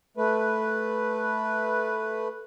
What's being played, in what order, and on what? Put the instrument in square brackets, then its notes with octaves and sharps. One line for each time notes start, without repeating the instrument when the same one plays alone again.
[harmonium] A3 B4